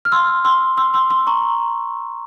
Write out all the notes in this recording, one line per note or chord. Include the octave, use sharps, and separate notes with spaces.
F6
C6 E6
C6 E6
C6 E6
C6 E6
C6 E6
A#5 C#6